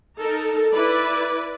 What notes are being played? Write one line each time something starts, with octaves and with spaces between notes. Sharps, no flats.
D#4 A4 A#4
E4 B4 D5